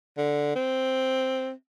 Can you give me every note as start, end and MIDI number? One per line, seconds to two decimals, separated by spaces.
0.18 0.54 50
0.56 1.52 60